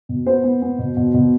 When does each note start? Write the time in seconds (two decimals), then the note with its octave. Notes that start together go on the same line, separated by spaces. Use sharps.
0.09 B2
0.26 B3 C5
0.44 B3
0.62 B3
0.79 B2
0.97 B2
1.14 B2